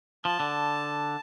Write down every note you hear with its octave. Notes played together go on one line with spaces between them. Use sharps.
F3 A5
D3